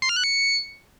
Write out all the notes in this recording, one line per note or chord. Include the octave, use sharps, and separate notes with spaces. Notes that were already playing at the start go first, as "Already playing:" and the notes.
C6
F6
F#6
C#7